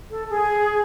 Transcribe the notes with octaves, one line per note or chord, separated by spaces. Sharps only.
A4
G#4